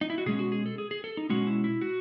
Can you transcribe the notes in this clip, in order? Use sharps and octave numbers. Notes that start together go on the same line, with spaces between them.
D#4
E4
F#4
B2 G#3 C#4 G#4
F#4
G#4
A4
G#4
G#4
A4
D#4
B2 G#3 C#4 F#4
E4
E4
F#4